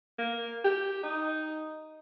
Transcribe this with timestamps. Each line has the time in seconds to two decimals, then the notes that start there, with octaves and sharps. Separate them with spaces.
0.18 A#3
0.64 G4
1.03 D#4